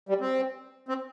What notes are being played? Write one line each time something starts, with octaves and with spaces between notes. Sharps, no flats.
G3
C4
C4